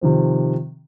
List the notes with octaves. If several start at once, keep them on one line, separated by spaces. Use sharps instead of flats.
C3 D#3 F3 C4